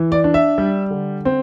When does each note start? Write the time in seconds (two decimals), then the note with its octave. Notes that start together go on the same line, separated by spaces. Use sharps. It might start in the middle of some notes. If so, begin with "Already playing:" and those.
Already playing: E3
0.12 D5
0.24 D4
0.34 E5
0.58 G3
0.91 D3
1.25 C4